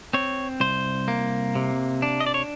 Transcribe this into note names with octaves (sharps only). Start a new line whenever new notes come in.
C4 C#5
C2 C5
A#3
C3
D4
D#5
D5
C#5